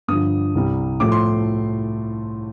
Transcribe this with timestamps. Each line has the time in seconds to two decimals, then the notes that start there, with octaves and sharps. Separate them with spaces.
0.08 G2 D3 F3 D#6
0.55 C2 C3 G3
1.00 A2 F3 A3 D6
1.12 C6